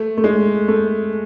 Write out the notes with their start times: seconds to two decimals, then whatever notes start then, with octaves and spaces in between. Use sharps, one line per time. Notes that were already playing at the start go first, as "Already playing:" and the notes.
Already playing: A3
0.18 A3
0.24 G#3
0.68 A3